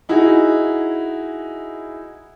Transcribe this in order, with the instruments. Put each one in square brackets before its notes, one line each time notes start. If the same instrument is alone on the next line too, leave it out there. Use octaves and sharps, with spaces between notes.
[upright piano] D#4 E4 F#4 G#4